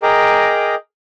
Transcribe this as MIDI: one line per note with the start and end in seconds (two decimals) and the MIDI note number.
0.03 0.75 68
0.03 0.75 70
0.03 0.75 75
0.03 0.75 79
0.03 0.75 82
0.03 0.75 86